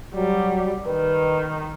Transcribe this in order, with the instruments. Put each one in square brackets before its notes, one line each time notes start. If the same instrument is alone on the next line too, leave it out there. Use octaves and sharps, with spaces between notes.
[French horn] F#3 [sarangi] G3
[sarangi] D#3 [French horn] B4